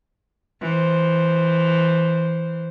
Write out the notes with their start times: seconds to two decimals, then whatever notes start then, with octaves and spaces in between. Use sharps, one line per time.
0.61 E3 C5